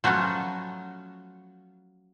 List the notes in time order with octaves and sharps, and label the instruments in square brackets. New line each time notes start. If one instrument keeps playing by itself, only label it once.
[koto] F3 F#3 A3 B3 C#4